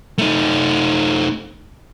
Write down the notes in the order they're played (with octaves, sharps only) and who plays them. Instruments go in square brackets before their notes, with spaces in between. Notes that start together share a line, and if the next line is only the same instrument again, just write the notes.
[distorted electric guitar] A3 D#4